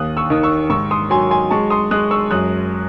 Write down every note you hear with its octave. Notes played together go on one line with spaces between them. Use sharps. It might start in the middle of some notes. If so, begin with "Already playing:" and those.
Already playing: D#2 D#6 F#6
C#6 E6
D#3 D#6
C#6 E6
G#2 C#6 E6
C6 D#6
F#3 G#5 C6
G#5 C6
G#3 A5 C#6
C6 D#6
G#3 D#6 F#6
C#6 E6
F#2 D#6 F#6